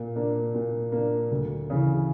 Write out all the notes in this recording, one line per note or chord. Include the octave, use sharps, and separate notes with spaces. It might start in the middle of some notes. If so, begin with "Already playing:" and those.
Already playing: A#2
A#3 D4
A#2
A#3 D4
D2
C#3 E3